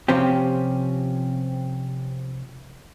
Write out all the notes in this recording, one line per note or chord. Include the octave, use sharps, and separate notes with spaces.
C3 F3 C4 C#4 G4